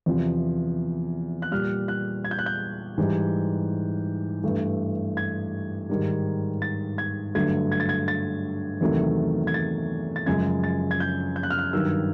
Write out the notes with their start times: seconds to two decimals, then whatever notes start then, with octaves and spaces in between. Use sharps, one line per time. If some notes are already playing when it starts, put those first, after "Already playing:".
0.06 E2 C3 F3
1.42 F#6
1.52 A#2 G3 F6
1.88 F#6
2.24 G#6
2.31 G6
2.39 F#6
2.46 G6
2.97 G#2 E3 G3
4.44 G2 E3 A3
5.17 G#6
5.90 G#2 D#3 G3
6.62 A6
6.98 G#6
7.35 G2 D3 F#3 A3 G#6
7.72 G#6
7.80 A6
7.89 G#6
8.08 A6
8.81 E2 C3 D#3 F#3 A3
9.47 G#6
9.54 A6
10.16 A6
10.26 F#2 C#3 F3 G#3 G#6
10.64 A6
10.91 G#6
11.00 G6
11.36 G6
11.43 F#6
11.51 F6
11.59 F#6
11.73 G2 D#3 F#3 E6